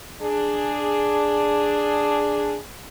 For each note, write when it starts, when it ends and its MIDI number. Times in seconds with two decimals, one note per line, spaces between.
0.21 2.59 62
0.21 2.59 68